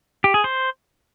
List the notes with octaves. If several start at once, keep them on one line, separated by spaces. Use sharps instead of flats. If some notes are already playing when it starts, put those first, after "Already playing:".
G4
G#4
C5